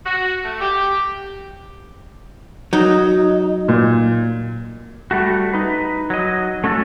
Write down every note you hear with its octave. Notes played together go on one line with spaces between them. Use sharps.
F#4
A3
G4
F#3 D#4
A#2
G3 A3 F#4
D#4 B4
F#3 D#5
A3 C#4 F#4 G4 A4